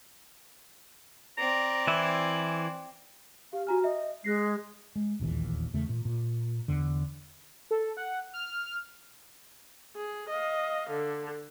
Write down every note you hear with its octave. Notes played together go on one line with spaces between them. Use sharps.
C4 D5 A#5
E3 E4 G#5
G4 F5
F#4 G#5 A#5 F6
D#5 E5
G#3 F#6 A#6 C7
G#3
E1 A#1 D#2 E3
E2 C#3 A3
A#2
A#2
E2 D3
A4
F#5
F6
G#4
D#5 F5
D3